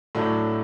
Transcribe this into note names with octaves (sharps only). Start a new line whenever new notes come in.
A2 F#3 A3 D4